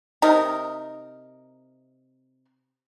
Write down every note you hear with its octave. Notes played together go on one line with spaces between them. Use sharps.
C3 D#4 A#4